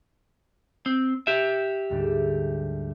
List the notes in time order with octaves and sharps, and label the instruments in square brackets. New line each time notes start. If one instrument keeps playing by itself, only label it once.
[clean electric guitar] C4
G4 E5
[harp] D2 G#2 G3